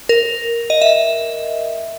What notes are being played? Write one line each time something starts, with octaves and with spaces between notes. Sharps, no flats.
A#4
D#5
E5